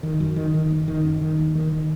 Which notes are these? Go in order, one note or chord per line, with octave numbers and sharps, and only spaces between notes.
D#3
F#2
D#3
D#3
F#1
D#3
F#2
D#3
D#2
D#3
D#3